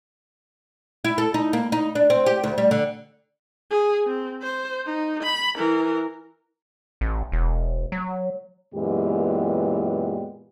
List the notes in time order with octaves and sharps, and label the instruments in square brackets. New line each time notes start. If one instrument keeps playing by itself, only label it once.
[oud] E4
A4
D#4
A#3
D#4
D4
C4
G4
D2
G3
D3
[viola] G#4
C4
C5
D#4
B5
E3 A#4
[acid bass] A1
E1
F#3
[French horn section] F#2 A#2 E3 G#3 B3 G4